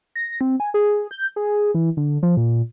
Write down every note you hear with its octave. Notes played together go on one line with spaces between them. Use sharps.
A#6
C4
G#5
G#4
G6
G#4
E3
D3
F3
A#2